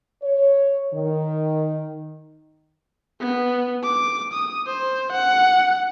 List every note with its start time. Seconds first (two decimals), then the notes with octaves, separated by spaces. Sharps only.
0.22 C#5
0.93 D#3
3.20 B3
3.83 D6
4.33 D#6
4.66 C5
5.12 F#5